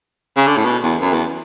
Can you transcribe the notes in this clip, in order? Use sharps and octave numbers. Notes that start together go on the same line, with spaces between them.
C#3
D3
A2
B2
E2
F#2
E2